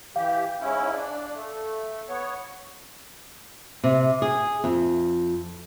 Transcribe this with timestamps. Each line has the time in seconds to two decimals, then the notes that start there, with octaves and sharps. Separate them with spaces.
0.16 E3 G4 F5
0.61 G#2 C#4 E4
0.92 D4
1.34 A3
2.09 B3 C#5
3.84 C3
4.22 G#4
4.64 F2